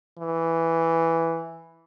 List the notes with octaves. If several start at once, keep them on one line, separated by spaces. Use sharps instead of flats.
E3